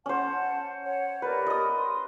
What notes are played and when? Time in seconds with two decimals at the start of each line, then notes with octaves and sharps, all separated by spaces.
0.06 C#4 C5 F#5 A5
0.83 C#5 F#5
1.22 G4 A#4 B4 D5
1.46 D#5 D#6
1.76 C6